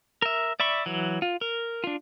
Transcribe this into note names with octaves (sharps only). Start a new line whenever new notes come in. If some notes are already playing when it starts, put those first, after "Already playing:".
A#4 E5
D5 E5 B5 C#6
E3 F#3
F4
A#4
D4 F4